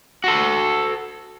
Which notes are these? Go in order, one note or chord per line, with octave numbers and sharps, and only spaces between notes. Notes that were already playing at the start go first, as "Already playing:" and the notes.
F#4 A4